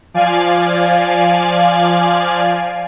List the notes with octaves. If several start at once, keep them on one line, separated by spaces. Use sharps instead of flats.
F3 D5 F5 G#5